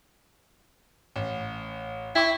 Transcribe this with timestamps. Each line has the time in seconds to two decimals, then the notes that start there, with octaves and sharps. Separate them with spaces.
1.16 A1
2.15 E4 G5 C#6